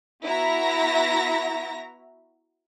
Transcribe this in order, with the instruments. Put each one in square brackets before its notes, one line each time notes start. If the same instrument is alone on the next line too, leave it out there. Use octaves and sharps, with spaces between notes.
[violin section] B3 E4 F#4 E5 A#5 A#6